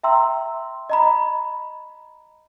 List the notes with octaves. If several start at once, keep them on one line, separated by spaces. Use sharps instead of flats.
E5 G5 A#5 C6 E6
D#5 A#5 B5